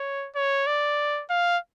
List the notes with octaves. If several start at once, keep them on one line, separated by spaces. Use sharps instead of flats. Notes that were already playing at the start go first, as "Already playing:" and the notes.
Already playing: C#5
C#5
D5
F5